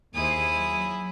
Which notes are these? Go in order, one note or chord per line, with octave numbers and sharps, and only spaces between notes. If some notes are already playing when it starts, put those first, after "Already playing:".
D#2 E4 G#4 C5 D#6
F#3